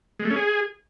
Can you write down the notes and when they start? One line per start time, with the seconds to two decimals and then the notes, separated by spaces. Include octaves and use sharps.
0.19 G#3
0.25 A3
0.31 C#4
0.36 G#4